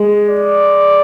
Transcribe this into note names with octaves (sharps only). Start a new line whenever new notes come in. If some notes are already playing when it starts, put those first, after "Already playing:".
Already playing: G#3
D5